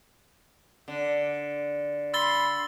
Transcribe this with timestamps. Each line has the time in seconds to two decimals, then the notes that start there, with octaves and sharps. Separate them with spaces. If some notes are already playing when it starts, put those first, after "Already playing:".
0.88 D3
2.14 B5 C6 E6 A6 G7